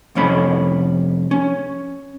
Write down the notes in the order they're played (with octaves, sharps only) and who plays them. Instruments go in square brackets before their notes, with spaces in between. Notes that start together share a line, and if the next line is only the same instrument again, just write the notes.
[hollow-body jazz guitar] C2 F2 C#4 B5
C#4